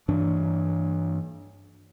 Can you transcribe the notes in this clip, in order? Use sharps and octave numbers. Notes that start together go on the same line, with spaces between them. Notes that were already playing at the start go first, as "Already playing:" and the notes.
G2 E3 D4